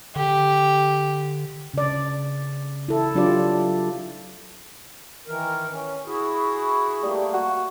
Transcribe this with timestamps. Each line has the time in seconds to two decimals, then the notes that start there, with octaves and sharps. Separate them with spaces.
0.16 D3 G4
1.74 C#3 D5
2.89 E4 A4
3.15 F#3 D4 F4 G4 D5
5.27 D#3 E3 A#4
5.71 C#4
6.07 E4 F#4 G#4
7.03 G3 A3 A#3
7.34 F#4